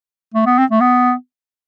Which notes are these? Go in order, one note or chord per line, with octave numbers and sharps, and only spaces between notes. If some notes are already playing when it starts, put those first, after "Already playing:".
A3
B3
C4
A3
B3